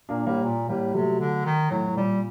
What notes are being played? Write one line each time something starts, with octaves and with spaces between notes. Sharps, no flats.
A#2 A#3 D4
A2 G3 A#3
A#2
A2 G3 A#3
C3 F#3 A3
D3
D#3
A2 F#3
A2
A#2 G3